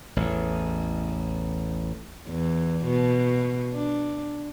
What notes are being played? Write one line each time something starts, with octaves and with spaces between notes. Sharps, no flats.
A1 E2
E2
B2
D4